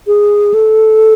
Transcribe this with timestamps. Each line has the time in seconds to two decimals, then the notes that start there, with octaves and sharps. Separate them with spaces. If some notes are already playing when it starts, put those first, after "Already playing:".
0.07 G#4
0.54 A4